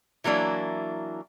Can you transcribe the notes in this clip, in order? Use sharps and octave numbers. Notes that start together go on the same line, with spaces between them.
E3 F#3 A#3 D4 E4